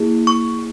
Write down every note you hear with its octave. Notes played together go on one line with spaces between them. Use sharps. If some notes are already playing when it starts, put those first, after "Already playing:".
Already playing: A#3 E4 G#4
C#6